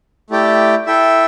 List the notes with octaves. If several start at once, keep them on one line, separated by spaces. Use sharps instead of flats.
A3 E4 G4 D5 G5
E4 A4 E5 G5